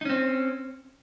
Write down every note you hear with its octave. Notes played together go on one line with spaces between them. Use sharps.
C4 C#4 D#4